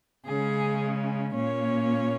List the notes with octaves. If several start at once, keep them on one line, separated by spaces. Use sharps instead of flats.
C#3 G#3 C#4 G#4
A#2 A#3 C#4 C#5